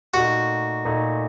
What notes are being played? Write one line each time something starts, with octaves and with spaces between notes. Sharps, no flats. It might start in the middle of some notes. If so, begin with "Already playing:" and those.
A#2 A3 D#4 F#4
A#2 A3 D#4